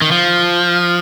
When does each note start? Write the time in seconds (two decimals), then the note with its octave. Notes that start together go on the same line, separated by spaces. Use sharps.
0.02 D#3
0.11 F3